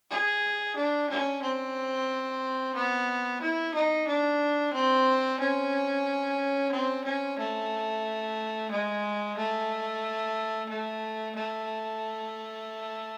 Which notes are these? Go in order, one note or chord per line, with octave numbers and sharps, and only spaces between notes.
G#4
D4
C#4
C4
B3
E4
D#4
D4
C4
C#4
C4
C#4
A3
G#3
A3
A3
A3